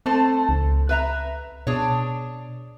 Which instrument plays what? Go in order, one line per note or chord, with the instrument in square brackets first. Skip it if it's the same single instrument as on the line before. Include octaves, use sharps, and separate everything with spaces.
[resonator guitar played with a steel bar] A3 A4 C5 [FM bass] C4
[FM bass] C#2
[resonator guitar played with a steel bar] B4 E5 A#5
[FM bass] B2 [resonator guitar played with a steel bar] D4 G#4 C#5